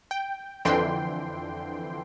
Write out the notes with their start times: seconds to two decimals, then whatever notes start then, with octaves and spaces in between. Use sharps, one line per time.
0.11 G5
0.65 F2 D3 E3 G5 C6